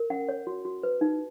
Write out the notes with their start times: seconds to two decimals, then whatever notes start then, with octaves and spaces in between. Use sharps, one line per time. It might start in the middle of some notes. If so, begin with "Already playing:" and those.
Already playing: A#4
0.10 C#4 F#5
0.29 C#5
0.47 F#4
0.65 F#4
0.83 B4
1.01 D#4